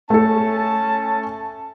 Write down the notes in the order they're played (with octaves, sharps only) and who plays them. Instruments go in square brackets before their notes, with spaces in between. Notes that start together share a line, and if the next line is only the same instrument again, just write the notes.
[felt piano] A3 A4 [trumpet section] C#4 A5